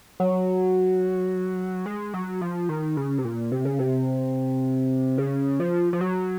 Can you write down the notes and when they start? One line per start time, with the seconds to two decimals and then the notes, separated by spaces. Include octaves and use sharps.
0.20 F#3
1.86 G#3
2.14 F#3
2.41 F3
2.69 D#3
2.97 C#3
3.18 C3
3.24 A#2
3.52 C3
3.65 C#3
3.79 C3
5.18 C#3
5.60 F3
5.93 F3
6.01 F#3